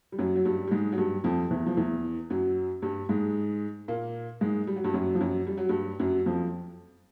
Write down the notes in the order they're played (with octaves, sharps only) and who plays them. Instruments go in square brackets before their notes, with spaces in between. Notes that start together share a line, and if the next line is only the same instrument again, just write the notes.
[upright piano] G3
F#2 F#3
F#3
G2 G3
G3
G#2 G#3
F#3
G2 G3
F2 F3
E2 E3
F3
E2 E3
F#2 F#3
G2 G3
G#2 G#3
A#2 A#3
G#2 G#3
G3
F#3
G2 G3
F#2 F#3
F3
F#2 F#3
G3
F#3
G2 G3
F#2 F#3
F2 F3